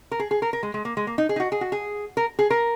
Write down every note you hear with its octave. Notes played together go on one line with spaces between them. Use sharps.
A#4
G#4
G#4
A#4
A#4
G#3
G#3
A#3
G#3
A#3
D#4
G#4
D#4
F#4
G#4
F#4
G#4
A#4
G#4
A#4